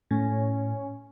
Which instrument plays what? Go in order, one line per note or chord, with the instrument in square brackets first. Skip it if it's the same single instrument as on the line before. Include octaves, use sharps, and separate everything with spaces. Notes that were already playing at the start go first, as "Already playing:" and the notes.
[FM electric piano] A2 [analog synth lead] C#4